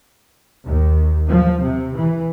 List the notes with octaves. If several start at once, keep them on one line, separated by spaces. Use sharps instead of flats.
D#2
F3
C3
E3